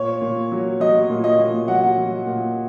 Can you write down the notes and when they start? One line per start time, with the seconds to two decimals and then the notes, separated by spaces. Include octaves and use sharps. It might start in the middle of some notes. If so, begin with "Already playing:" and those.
Already playing: A#2 C#5
0.21 A#2
0.52 F#3
0.80 F#3 D#5
1.09 A#2
1.24 D#5
1.39 A#2
1.68 F#3 F#5
1.98 F#3
2.27 A#2